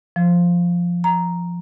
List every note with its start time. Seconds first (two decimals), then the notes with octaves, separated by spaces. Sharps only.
0.16 F3
1.04 A#5